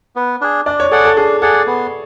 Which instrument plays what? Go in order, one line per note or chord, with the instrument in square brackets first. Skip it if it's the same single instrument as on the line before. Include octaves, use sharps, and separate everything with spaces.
[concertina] B3
D4 G#4
[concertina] D4 [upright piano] D5
[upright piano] C#5
[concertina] G#4 D5 F#5 [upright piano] A4
[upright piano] A4
[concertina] D4 [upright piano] G#4
[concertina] G#4 D5 F#5 [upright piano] A4
[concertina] B3